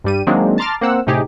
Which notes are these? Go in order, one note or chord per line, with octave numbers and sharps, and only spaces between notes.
G2 G3 D#7
D#3 F#3 G#3 A#3 C4 D4
A5 A#5 C6 D6 F6 A6
A#3 C4 F#5 E6
A2 C3 D#4 G4 G#4